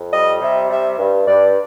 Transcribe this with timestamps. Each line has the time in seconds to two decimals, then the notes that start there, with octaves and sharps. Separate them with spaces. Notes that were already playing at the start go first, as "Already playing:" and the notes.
Already playing: F2
0.13 G3 D#5
0.42 C3 E5
0.70 G3 E5
0.98 G2
1.27 G2 D5